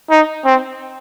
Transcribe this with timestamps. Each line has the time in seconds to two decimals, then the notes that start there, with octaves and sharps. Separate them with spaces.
0.11 D#4
0.45 C4